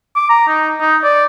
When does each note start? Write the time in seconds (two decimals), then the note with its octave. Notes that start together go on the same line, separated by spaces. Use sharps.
0.16 D6
0.30 A#5
0.48 D#4
0.80 D#4
1.04 D5